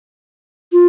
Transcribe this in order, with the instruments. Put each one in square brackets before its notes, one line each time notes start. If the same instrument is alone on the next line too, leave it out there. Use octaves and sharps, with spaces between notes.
[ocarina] F4